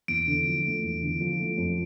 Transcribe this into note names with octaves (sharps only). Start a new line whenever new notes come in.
E2 D7
D3
F3
A3
E2
D3
F3
A3
F2